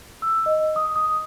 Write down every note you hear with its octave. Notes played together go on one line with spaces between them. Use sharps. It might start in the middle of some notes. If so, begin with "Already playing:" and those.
E6
D#5
D#6
D#6